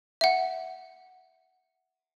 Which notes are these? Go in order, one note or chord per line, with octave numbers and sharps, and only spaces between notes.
E5 F#5